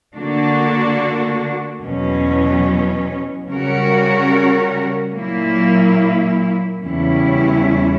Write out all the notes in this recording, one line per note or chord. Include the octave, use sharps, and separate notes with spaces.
D3 A#3 D4 F#4
E2 B2 F#3 C#4
C#3 G3 C#4 F#4 A#4
A#2 F#3 A#3 E4
E2 C#3 G3 C#4 E4